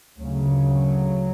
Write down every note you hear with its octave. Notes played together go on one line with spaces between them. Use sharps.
D2 C#3 F#3